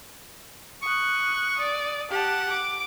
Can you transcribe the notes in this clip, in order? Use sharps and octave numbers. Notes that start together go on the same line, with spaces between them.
C#6 D#6 F#6
D5 D#6
G4 F#5 A5
D6